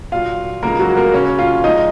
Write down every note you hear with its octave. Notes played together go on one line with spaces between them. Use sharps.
A#2 F#3 F4 F5
C#3 F3 G#3 A#3 A#4
F#3 F#4
A#3 A#4
C#3 F#3 C#4 C#5
F4 F5
A#2 F3 G#3 D#4 D#5